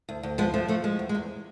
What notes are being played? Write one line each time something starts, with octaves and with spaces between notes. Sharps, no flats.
D2
D2
F3 G#3 B3
F3 A3
F3 A3
F3 G#3
E2
G#3
E2